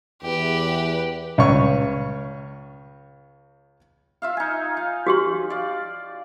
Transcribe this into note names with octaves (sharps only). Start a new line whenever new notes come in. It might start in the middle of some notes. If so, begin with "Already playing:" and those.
E2 G4 B4
C#2 C#4 C#5 C#6
F4 E5 F5
D#4 G#5
F5
F#4 G4 C6
D5 F5